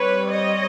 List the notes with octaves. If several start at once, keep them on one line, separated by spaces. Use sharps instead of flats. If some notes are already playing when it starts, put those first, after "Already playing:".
Already playing: G3 C4 B4 C#5
C#5 D#5